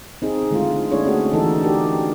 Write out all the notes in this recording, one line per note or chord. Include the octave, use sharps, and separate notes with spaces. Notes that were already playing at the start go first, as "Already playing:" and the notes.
C4 D#4 G#4
D3 G#3 A3 E4 F4
A#3 C#4 D4 E4 G#4 C#5
A3 C4 C#4 F#4 G#4
D3 E3 D#4 A4
D4 D#4 F#4 G4 A#4